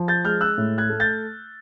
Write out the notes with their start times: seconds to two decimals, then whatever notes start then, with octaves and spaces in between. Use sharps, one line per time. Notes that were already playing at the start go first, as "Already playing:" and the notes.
Already playing: F3
0.08 G6 A6
0.24 G#3 F6 G6
0.41 E6 F#6
0.58 A2
0.78 F#6 G#6
0.90 A3
1.00 G6 A6